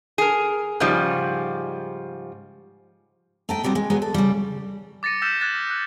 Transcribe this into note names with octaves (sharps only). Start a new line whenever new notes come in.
G#4 A#4
G#2 C#3 F3 G3
A3 D#4 G5
F#3 G3 B3 C4
G#3
F#3 G#3 B3 G#4
A4
C#3 G3
D6 A6 A#6 C#7 D#7
E6 F6 G6 A6 B6 E7
F#6 G#6 A6
F#6